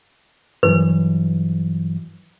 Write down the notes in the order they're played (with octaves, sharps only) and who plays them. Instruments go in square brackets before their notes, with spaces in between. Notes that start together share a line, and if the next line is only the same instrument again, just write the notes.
[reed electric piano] G2 E3 F#3 [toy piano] B4